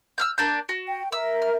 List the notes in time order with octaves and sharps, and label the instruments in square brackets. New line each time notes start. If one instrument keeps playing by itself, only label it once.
[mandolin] E6 F6 G6
A#3 D4 G6
F#4
[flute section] G5
[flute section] A#4 E5 [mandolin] E6
[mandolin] F6